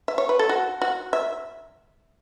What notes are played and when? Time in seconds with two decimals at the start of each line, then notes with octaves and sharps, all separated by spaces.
0.08 E5
0.18 C#5
0.29 B4
0.39 A4
0.49 F#4
0.82 F#4
1.13 E5